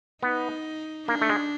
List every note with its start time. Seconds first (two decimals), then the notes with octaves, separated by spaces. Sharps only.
0.23 B3 D#4
1.08 A#3 D4
1.22 A3
1.29 G#3